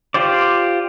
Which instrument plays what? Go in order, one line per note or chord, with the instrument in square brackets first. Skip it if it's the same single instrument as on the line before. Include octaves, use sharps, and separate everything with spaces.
[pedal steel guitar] F4 G4 C5 D5